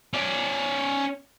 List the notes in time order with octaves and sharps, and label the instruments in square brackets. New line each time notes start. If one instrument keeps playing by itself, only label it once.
[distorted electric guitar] C#4 D5